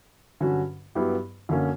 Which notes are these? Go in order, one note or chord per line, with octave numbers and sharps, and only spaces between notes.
G2 D3 F#3 C#4 F#4
G2 F#3 B3 E4 G4
F#2 D3 F#3 A#3 C#4